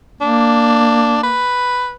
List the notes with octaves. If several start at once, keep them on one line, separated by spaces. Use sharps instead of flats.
A#3 D4
B4